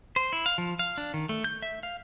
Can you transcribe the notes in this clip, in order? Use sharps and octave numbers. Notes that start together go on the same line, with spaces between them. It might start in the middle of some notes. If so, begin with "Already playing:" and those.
C5
E4
F5
F3
F5
D4
D#3
A3
G6
E5
F5